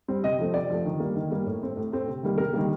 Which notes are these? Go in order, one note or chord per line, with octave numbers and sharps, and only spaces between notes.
G3 C4
C3 D#5
F3 A3 C4
C3 D5
F3 A3 C4
D#3
G3 A#3
D#3
G3 A#3
A2
A3 C4
A2
A3 C4
C3
D#3 G3 A#3
C3 A#4
D#3 G3 A#3